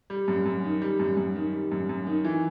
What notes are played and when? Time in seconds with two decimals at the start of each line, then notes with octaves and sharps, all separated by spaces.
0.10 G3
0.28 F#2
0.46 F#2
0.64 D#3
0.82 G3
1.00 F#2
1.17 F#2
1.36 D#3
1.53 G3
1.72 F#2
1.89 F#2
2.07 D#3
2.25 E3